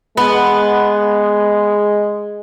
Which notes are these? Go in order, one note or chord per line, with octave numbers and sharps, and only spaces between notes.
G#3 B3